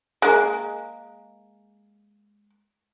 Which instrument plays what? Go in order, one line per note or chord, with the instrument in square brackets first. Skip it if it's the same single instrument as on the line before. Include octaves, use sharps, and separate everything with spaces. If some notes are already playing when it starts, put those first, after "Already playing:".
[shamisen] G#3 A#3